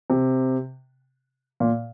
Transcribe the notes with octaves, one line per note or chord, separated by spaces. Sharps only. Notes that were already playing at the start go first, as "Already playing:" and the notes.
C3
A#2